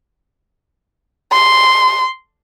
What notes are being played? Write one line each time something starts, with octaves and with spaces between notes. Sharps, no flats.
C6